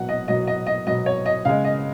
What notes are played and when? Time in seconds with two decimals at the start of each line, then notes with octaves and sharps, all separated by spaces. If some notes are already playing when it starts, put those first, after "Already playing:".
Already playing: B2 F#3 F#5
0.09 D#5
0.28 B2 F#3 D#5
0.47 D#5
0.66 D#5
0.87 B2 F#3 D#5
1.06 C#5
1.26 D#5
1.45 C#3 G#3 F5
1.64 D#5